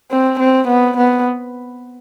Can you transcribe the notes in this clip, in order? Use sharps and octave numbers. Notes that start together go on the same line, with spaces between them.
C4
C4
B3
B3